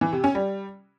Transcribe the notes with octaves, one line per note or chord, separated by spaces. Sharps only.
E3
C3
C#4
G3